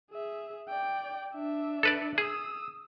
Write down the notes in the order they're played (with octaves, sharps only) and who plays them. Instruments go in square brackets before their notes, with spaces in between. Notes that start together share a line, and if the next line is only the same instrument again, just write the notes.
[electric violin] G#4 E5
D5 G5
D4 E5
[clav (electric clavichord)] A4 B4 D5
[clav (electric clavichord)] G#4 [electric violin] D#6 E6